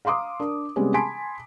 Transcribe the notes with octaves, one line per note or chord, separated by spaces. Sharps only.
F5 A#5 C6 D6 D#6
D4 A#4
C3 G3 G#3 B3 C#4 G#4
G#5 A5 B5 C6 B6 D7